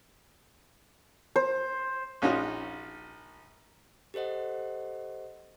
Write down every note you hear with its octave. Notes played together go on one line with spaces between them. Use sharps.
C5
A#1 C#4 D#4 F4 F#4
G4 A4 C5 D#5 F#5